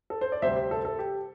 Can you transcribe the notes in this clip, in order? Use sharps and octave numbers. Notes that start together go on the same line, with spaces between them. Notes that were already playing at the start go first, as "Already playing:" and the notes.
A4
C5
D5
D2 C3 G3 C5 E5
G4 C5
A4
A4
G4